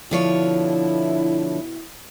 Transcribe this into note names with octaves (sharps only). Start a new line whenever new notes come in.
B2 D3 F3 E4 C#5